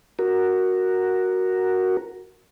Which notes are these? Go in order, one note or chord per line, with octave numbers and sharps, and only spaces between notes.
F#4 A#4